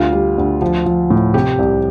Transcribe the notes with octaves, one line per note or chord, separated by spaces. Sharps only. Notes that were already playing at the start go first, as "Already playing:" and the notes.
Already playing: D2 G3 F4
G3
D2
F3
F3
A2
C3 G4
C2